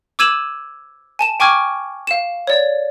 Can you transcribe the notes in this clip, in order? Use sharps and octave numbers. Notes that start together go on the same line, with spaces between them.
D6 E6 G#6 D#7 E7 F#7
G#5 A5 E7
G5 G#5 C#6 D6 F6 G#6
F5 E7
C#5 D5